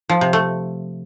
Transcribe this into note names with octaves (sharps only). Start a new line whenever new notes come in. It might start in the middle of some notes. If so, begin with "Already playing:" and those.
F3
C3
A3